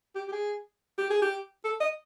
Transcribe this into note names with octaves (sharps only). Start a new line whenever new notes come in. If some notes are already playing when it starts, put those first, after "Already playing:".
G4
G4
G#4
G4
G#4
G4
A4
D#5